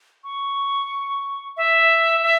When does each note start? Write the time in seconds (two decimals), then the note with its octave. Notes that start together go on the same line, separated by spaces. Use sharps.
0.24 C#6
1.57 E5
2.23 E5